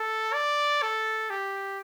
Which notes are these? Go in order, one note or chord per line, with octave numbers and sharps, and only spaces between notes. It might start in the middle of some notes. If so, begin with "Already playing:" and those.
Already playing: A4
D5
A4
G4